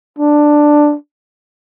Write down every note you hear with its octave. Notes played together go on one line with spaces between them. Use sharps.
D4